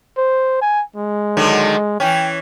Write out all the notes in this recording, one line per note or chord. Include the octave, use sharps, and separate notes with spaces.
C5
G#5
G#3
D3 D#3 F#3
E3 C#4 G5